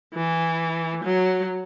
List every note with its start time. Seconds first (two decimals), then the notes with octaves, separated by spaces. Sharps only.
0.14 E3
1.04 F#3